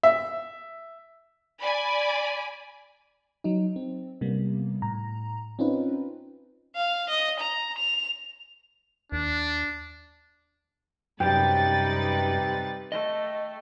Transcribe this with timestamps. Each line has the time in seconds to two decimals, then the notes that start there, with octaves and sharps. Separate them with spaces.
0.03 E5
1.60 D5 G#5 B5
3.44 F#3 D#4
3.76 C4
4.21 C3 G3 A#3 B3
4.82 A2 A#5
5.59 C4 C#4 D#4 F4 B4
6.76 F5
7.09 D#5
7.40 A#5
7.78 F7
9.12 D#2 D4
11.20 F#2 C3 G3 D#4 B4 G5 A6
12.92 A3 D#5